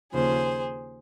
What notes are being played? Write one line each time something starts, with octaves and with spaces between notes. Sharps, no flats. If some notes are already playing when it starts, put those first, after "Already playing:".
D#2 C#3 F3 G#4 C5